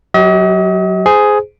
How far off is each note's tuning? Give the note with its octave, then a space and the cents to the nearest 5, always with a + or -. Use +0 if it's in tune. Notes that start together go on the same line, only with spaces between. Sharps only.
F#3 +0 G4 -45 D#5 +45
G#4 +5 C5 -25